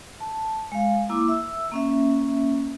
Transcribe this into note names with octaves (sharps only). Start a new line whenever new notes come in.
A5
G#3 F5
A#3 E4 D6
E5 E6
A#3 C#4 E5